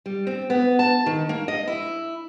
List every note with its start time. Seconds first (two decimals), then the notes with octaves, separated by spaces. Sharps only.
0.06 G3
0.27 C4
0.50 B3
0.79 A5
1.06 D#3
1.29 A#3
1.48 D#5
1.67 E4